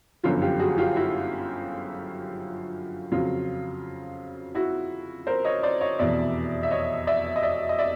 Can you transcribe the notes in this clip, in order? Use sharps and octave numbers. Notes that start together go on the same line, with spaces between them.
G1 F#2 D3 F3 F4
F4 G4
F#4 G#4
F4 G4
E4 F#4
F2 C#3 F#3 F4
E4 F#4
A#4 C5
C#5 D#5
C5 D5
C#5 D#5
F1 E2 B2 D5 E5
E5
C#5 D#5
D5 E5
D#5
D5 E5
D#5
D5 E5